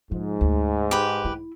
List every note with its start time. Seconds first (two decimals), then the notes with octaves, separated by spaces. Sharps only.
0.11 G#2 F3
0.41 D2
0.91 G4 B4
1.25 E4